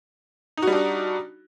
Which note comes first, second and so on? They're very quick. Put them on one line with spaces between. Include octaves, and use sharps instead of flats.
D#4 F#4 G3 D4